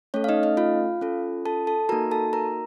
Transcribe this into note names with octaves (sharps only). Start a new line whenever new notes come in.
A3 C#4 A4 C#5
F5
D#4 D#5
D#4 D#5
F4 F5
C#4 F4 A4
A4 A5
A4 A5
A#3 D#4 F#4 A#4 A#5
A4 A5
A#4 A#5